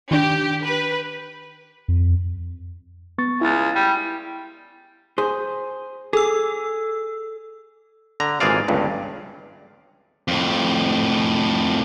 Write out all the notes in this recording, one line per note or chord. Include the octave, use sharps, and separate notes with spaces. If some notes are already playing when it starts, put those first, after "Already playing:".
D#3 D4 G4
B4
F2
B3 C#6 A6
C#2 E4 A6
G3
G#4 C5
G#4 A4 E6
D3 A#5
G#1 A#2 E3 G#4 D5 F5
G1 C#2 G2
F2 A2